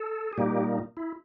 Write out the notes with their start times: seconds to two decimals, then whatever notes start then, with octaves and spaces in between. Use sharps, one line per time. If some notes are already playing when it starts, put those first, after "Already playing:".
Already playing: A4
0.33 G#4
0.38 A#2 G3 A#3 D#4 G4
0.97 E4